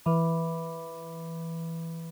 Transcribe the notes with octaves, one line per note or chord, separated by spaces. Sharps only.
E3 B4 E5 B5 D6